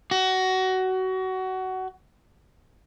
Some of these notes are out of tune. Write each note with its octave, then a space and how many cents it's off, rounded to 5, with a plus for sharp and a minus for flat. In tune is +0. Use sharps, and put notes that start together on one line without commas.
F#4 +20